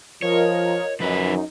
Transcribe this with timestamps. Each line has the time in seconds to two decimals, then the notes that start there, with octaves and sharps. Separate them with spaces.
0.22 F3 F4 A#4 C#5 D#5
1.00 F#2 F3 D#4 B4